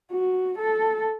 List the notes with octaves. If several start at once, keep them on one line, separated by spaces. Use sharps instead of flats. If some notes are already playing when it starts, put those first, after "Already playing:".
F#4
A4